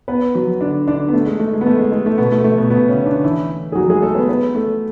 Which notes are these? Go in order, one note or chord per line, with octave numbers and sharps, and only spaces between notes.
B3 B4
F#3 F#4
D3 D4
D3 D4
B3
A3
G#3
A3
G#3
B3
A3
G#3
G#3
A3
B2 B3
A3
A3
B2 B3
B2 B3
C#3 C#4
D3 D4
E3 E4
G#4
F#3 F#4
G#3 G#4
A3 A4
B3 B4
B3 B4
A3 A4